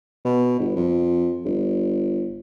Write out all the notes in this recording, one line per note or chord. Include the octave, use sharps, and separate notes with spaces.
B2
G1
F2
G1